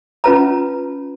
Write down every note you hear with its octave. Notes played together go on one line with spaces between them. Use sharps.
C#4 F4 B4 A5 A#5